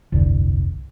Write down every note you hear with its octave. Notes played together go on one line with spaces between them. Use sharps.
F1 C2 G2 D3